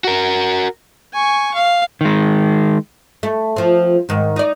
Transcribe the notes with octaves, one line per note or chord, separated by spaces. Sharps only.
F#4 A#4
G#5 C#6
F5
D#3 G#3
A3
F3 C4
G#2 D#3
D#4 D5